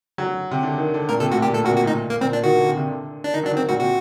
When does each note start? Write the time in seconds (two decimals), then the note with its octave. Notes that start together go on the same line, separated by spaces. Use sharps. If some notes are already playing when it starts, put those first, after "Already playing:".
0.18 F#3
0.51 C3
0.63 D3
0.78 D#3
0.94 D3
1.09 A#2 A#4
1.20 C3 A4
1.31 A2 F#4
1.42 A#2 G4
1.53 A2 A4
1.65 A#2 F#4
1.69 C3
1.76 F#4
1.84 A2 D#4
2.10 A#3
2.21 A#2 C4
2.33 D4
2.44 D#3 F#4
2.56 D3
2.67 C3
2.77 C3
2.90 D3
3.24 D4
3.34 D#3 D#4
3.43 F#3 D4
3.51 D#3
3.57 C4
3.69 A#2 F#4
3.79 C3 F#4